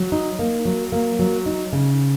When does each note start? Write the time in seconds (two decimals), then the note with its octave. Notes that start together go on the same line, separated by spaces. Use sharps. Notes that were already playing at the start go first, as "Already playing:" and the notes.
Already playing: F#3
0.12 D#4
0.39 A#3
0.65 F#3
0.92 A#3
1.19 F#3
1.46 D#4
1.73 C#3